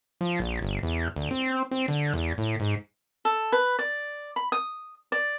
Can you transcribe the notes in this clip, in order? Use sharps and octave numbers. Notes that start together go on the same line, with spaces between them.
F3
A#1
G1
E2
D2
C4
C4
D3
E2
A2
G#2
A4
B4
D5
B5
D#6
D5